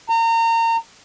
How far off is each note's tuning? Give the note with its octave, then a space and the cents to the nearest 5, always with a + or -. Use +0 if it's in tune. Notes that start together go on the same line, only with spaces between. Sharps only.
A#5 -30